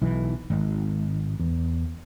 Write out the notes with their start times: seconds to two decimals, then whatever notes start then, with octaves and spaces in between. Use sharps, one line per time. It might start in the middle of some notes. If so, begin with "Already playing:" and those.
0.01 B1 E3
0.50 G#1
1.40 E2